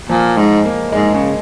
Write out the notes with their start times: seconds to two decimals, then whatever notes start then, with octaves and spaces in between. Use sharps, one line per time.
0.09 A#2 F3
0.37 G#2 G#3
0.65 A#3
0.92 G#2 G#3
1.14 C#3